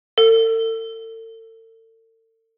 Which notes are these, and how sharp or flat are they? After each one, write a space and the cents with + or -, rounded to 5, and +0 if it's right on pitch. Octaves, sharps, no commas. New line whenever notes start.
A4 +40